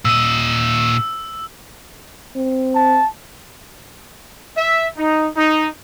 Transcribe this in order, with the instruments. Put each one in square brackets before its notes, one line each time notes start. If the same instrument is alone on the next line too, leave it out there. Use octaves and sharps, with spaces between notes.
[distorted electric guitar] A#2 D#5 [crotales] E6
[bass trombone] C4
[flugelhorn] A5
[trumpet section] E5
D#4
D#4